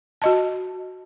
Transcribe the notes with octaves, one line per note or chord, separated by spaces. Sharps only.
F#4 D#5 A5